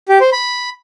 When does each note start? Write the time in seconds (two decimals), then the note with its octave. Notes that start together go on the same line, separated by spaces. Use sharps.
0.09 G4
0.21 C5
0.33 B5